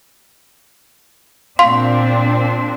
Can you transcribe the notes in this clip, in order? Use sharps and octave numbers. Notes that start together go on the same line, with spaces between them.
A#2 C4 D4 F5 C6